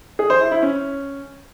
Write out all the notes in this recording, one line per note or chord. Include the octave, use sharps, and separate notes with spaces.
G#4
C5
E4
E4
C#4